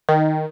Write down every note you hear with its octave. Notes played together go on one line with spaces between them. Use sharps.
D#3